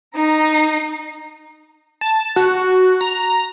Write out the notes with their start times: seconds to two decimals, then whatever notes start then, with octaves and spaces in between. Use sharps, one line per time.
0.15 D#4 A#5
2.01 A5
2.36 F#4
3.01 A#5